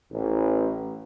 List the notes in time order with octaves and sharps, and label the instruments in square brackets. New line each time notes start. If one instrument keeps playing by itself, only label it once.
[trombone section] A1